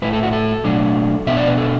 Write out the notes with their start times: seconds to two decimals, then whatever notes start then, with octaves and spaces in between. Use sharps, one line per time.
0.02 A2 A3 E4 B4
0.13 A4
0.23 F#4
0.33 A4
0.64 B2 F#3 A3 D4
1.26 B2 B3 D4 E5
1.37 D5
1.47 B4
1.58 A4